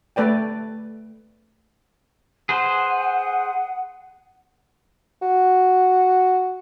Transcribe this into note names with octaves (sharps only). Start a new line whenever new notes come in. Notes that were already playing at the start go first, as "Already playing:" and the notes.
A3 B4 D5 G5
G#4 B4 C5 F#5
F#4